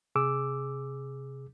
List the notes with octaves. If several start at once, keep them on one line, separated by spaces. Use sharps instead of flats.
C3 G#4 D6 E6